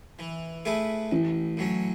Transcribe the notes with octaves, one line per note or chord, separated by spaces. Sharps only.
E3
A3 E4 G#4 B4
A1 E3
A2 F#3 C#4